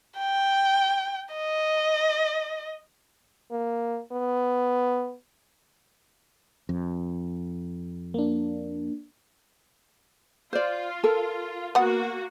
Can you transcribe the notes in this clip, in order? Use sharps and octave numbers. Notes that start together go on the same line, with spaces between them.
G5
D#5
A#3
B3
F2
A#3 D4
F4 C5 D5
A4 A#4
A#3 B3 F#4 F#5